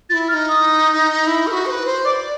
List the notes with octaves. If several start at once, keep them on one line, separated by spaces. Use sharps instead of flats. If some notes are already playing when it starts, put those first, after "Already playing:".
F4 A6
E4
E4 F6
D#4
D#6
E4
A#4
F#4
C5
B4
C5
D5 D6